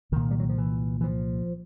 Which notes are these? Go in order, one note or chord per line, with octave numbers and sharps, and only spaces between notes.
C2 A#2 D#3
G3
F#3
F3
E3
E3
F3